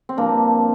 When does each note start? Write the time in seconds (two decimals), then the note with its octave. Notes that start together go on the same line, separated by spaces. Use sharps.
0.09 C4
0.17 G2 F3 A#3 D4